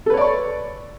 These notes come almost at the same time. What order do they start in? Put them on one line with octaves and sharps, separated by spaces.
A4 B4 C#5 D5 C#6